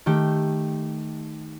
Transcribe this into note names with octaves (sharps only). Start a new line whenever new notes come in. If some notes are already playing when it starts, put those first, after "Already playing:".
D#3 A3 G4 G5